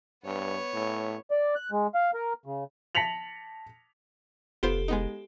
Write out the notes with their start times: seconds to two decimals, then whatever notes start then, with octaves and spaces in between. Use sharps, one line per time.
0.24 G2 B3 C#5
0.73 A2
1.31 D5
1.55 F#6
1.72 G#3
1.95 F5
2.14 A#4
2.46 C#3
2.95 A5 A#6 B6 C#7 F7 F#7
4.63 F1 B3 F4 G4 A4 C5
4.88 G#3 B3 D#4